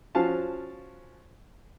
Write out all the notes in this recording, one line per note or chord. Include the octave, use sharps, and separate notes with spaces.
F3 C#4 F#4 F5 A5